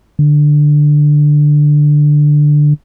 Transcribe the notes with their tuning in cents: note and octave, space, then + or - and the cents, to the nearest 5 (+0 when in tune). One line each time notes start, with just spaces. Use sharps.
D3 +10